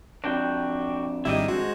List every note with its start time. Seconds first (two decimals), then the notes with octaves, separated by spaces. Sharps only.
0.24 F2 D4 F#4 G5
1.25 G#1 D#3 G3 E4 G4 D#5
1.48 G#3 F#4 C5